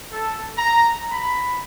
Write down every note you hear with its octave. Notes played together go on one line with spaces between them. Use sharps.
A4
A#5
B5